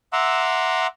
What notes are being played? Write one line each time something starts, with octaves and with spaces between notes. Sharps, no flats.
E5 F#5 A#5 C6 D6 E6